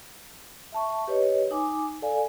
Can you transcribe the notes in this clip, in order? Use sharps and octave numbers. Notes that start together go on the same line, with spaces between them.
E5 A5 C#6
G4 B4 C#5 D#5
D#4 G#5 D6
A4 D5 F5 G#5